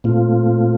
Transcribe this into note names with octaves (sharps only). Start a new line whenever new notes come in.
A#2 A3 C4 F4